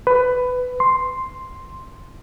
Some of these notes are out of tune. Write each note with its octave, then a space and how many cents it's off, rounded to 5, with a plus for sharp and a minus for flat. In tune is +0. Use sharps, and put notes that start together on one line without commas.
B4 +15
C6 +0